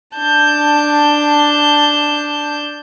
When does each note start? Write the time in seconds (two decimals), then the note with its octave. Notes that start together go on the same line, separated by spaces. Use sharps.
0.17 D4 A5 G6